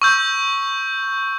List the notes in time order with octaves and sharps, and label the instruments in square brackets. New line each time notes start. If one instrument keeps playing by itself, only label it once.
[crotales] C#6 E6 G6